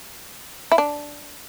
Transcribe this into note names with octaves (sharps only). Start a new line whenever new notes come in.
E4
D4